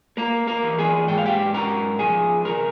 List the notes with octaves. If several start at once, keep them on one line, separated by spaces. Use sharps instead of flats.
A#3 A#4 A#5
A#4 A#5
E3
G#4 G#5
G#2 G5
F5
G4 G5
C#4 A#4 A#5
F3 G#4 G#5
C3 A#4 A#5